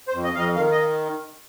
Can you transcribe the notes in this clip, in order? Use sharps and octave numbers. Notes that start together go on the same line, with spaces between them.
C5
F2
D#5
F2 F5
D#5
D#3 F5
D#5